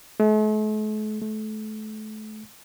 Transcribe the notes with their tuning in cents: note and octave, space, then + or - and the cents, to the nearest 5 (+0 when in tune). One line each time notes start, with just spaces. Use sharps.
A3 -45
A3 -30